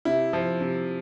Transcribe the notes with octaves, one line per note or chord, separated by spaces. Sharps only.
C3 E4
F3
C3